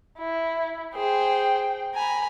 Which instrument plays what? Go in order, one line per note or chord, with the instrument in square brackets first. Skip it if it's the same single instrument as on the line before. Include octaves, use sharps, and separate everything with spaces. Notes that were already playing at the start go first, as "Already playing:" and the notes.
[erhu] E4
[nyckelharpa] G#4 C5 [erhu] G5
[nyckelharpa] G#5 B5 [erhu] A#5